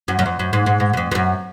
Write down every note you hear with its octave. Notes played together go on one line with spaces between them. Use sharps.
F#2
F#2
F2
F#2
G#2
G#2
G#2
F#2
F2
F2
F#2